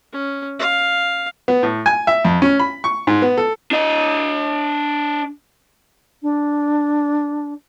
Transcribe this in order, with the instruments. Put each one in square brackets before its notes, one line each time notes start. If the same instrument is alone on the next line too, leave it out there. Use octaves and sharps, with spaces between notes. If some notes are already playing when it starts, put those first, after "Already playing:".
[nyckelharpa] C#4
F5
[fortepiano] B3
A2
G#5
E5
F2
C#4
B5
C#6
G#2
B3
A4
[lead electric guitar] D4 D#5
[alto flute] D4